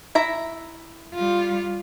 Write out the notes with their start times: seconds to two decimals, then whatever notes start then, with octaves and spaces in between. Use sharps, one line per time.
0.15 E4 E5 A#5
1.15 G3 F4